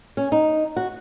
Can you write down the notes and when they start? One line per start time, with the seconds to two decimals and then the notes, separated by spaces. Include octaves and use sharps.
0.17 C#4
0.32 D#4
0.77 F#4